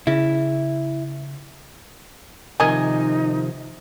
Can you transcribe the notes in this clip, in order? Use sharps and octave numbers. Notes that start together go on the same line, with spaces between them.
C#3 E4
C3 D#3 F3 D#4 A#4 D#5 G#5